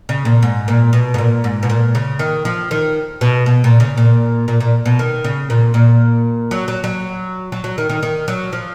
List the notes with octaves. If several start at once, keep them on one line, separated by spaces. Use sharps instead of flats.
C#3
A#2
G#2
A#2
B2
G#2
A#2
G#2
B2
A#2
C#3
D#3
F3
D#3
B2
B2
A#2
C#3
A#2
A#2
A#2
B2
D#3
C#3
A#2
A#2
F#3
F#3
F#3
F#3
F#3
D#3
D#3
D#3
F#3
F3